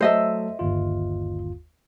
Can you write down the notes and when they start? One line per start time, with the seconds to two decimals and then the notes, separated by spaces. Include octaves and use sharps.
0.01 F#3 A3 A4 C5 D#5 E5
0.59 G1 D#2 F4